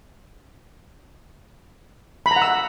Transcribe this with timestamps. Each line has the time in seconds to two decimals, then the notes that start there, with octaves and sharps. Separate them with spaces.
2.26 B5
2.31 A#5
2.36 F#5
2.42 E6